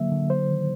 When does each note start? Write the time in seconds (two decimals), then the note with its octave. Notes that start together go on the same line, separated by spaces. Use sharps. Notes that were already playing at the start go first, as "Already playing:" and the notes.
Already playing: D3 F#3 A#3 E5
0.11 D3
0.30 F#3 C5
0.50 D#3